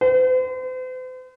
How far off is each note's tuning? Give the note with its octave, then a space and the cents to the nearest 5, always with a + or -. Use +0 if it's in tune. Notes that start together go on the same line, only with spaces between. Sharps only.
C5 -45